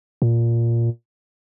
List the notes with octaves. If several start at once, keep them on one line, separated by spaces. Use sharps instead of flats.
A#2